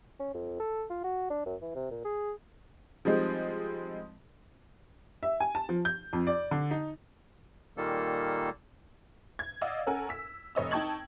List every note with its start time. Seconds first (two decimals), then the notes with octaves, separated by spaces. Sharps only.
0.20 C#4
0.34 F2
0.60 A4
0.90 F4
1.04 F#4
1.30 D4
1.46 F#2
1.62 E3
1.75 C3
1.91 A#2
2.05 G#4
3.05 F3 G3 G#3 C4 D#4
5.23 E5
5.40 G#5
5.55 A5
5.69 F3
5.85 G6
6.13 F2
6.27 D5
6.51 D3
6.71 D#4
7.77 A#2 D#3 G3 A#3 A4
9.39 G#6
9.61 D5 D#5 F5 F#5 E6
9.86 C#4 A4 A#4 F#5 G#5
10.09 E6 B6
10.55 F1 C#5 D#5 E6
10.71 D#4 G5 A5 C#6 G#6 F#7